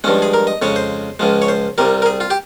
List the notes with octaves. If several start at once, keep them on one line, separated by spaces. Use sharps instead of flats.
G2 F3 G#3 C#4
G#4
A#4
D#5
F2 C#3 G#3 C#5
C5
C#2 C#3 F3 G#3
C#5
C5
C2 C3 G3 A#4
A#4
G#4
F4
G4